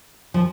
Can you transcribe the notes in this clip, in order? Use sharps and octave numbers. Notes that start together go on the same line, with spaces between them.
F3